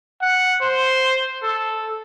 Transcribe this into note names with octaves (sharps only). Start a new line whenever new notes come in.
F#5
C5
A4